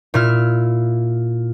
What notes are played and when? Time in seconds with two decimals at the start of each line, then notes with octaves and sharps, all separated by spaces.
0.14 A#2 E4 F6